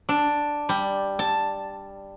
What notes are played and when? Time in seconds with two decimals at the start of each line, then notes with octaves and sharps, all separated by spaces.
0.09 D4
0.69 G3
1.19 A5